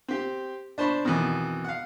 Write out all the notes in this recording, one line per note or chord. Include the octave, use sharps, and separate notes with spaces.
C4 G4
D4 C5 A5 B5 C#6
F2 B2 D#3 E3
F5 F#5